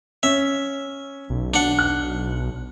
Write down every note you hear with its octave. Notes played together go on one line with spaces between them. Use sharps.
C#4 E5
B1
D4 F#5
F#6